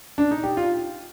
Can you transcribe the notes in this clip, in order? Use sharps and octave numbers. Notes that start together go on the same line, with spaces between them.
D4
D#4
G4
F4